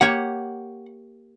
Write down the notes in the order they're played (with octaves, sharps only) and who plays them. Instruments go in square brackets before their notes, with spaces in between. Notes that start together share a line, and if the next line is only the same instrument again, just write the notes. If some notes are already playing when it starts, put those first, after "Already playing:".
[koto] A#3 G4 C#5 [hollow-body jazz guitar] F#5